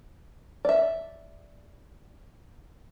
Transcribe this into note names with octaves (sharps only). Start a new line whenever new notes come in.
D5 E5